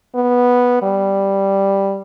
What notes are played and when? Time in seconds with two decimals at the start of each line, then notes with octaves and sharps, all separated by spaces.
0.15 B3
0.82 G3